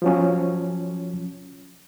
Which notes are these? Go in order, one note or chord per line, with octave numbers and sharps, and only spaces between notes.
F3 F#3 C#4